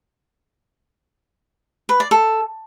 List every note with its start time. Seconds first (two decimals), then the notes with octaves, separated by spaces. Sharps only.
1.89 B4
2.00 D5
2.11 A4